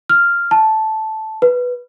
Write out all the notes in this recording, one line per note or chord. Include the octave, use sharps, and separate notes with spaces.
F6
A5
B4